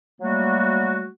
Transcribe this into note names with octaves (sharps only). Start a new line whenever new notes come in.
F#3 G3 A3 A#3 F#4